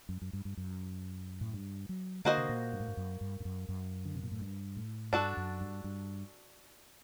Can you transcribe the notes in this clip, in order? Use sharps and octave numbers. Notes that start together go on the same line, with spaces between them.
F#2
F#2
G2
G2
F#2
A2
G2
F#3
D3 A#3 F#4 C5 D#5
C3
A#2
G2
A2
G2
F#2
G2
G2
F#2
F#2
D3
C3
A#2
A2
G2
A2
G2 D4 F#4 A4
F#2
G2
G2